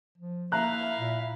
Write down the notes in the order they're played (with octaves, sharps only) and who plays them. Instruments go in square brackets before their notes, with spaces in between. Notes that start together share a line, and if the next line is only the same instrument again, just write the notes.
[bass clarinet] F3
[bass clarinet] A#3 [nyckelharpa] E4 F5 [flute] E5 [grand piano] A#5 F#6
[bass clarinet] A#2